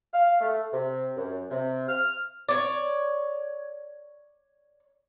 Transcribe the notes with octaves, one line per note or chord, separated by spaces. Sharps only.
F5
A3
C3
F#2
C3
F6
C#5 D5